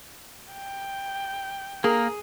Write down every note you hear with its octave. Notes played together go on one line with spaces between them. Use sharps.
G5
A#3 G#4 A#4